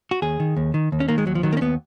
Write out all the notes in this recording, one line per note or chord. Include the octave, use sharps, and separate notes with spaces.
F#4
D#2 G#4
D#3
D#2
D#3
D#2
C#4
D#3 A#3
G#3
D#2 F#3
F3
D#3 F#3
A#3
C#4
D#2 B3